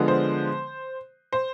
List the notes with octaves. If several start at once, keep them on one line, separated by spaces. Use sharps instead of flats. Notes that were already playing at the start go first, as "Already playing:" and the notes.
Already playing: D3 F3 G#3 B3
C5
C5